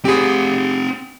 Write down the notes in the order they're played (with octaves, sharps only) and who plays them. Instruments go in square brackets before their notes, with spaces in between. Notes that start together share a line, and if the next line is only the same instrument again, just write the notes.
[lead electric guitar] C4 F#5 [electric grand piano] G4 G#4